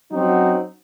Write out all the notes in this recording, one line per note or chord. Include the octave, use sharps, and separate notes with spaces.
F#3 C4 C#4 D#4 F#4